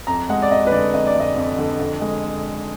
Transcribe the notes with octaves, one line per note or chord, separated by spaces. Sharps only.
F2 A#5
G#3 F#5
D5
F2 D#5
B4
D3 D5
F2 D#5
D5
G#3 D#5
F2
D3
F2
G#3